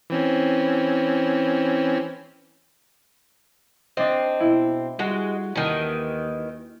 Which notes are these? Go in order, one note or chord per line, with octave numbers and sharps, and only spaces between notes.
E3 C4 C#4
C4 D4 D#5
B2 E4
G3 G#3 F#4
D#2 D#3 E3